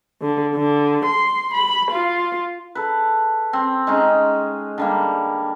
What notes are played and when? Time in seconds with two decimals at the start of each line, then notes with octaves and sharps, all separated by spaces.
0.22 D3
0.56 D3
1.06 C6
1.54 B5
1.92 F4
2.75 A4 B4
3.53 C4
3.87 G#3 C#4 D#4
4.78 D3 G3 A#3